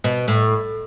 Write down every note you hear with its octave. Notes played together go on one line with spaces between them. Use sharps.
B2
A2